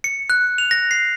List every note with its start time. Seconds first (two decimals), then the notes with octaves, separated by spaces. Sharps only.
0.04 C#7
0.30 F#6
0.58 F7
0.71 A#6
0.91 C7